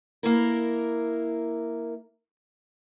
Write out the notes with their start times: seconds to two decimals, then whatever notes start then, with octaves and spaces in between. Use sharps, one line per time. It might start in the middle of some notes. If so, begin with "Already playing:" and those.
0.23 A#3 E4 A#4